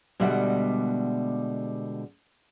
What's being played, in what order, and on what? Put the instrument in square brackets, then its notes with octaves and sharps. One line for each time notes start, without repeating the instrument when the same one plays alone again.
[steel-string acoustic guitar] B2 D3 G3 G#3 E5 F#5